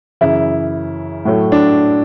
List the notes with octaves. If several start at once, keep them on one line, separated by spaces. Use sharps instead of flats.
F#2 C#3 E3 E4
A2 F#3 A3
D4